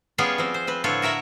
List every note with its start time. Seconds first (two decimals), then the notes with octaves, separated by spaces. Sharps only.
0.18 G3 B3 C#4 F4 G#4 C#5
0.38 F3 C4
0.54 C5
0.67 C4 B4
0.84 A2 D3 F4 A4 B4 C#5
1.02 F#4 A#4 E5 F#5